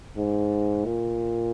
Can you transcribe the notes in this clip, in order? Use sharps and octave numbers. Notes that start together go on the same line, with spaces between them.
G#2
A#2